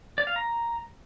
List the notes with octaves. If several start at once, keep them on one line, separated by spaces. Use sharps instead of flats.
D5
F5
A#5